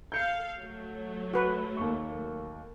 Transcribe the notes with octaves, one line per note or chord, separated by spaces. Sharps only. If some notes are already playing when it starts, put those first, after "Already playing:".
A4 F5 G6 C#7
F#3 A3
F#4 B4
D#2 A#3 C#6